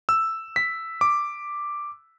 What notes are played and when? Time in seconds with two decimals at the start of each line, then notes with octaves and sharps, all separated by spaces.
0.09 E6
0.56 B6
1.01 D6